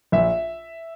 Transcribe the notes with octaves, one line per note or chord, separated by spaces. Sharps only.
A#1 E5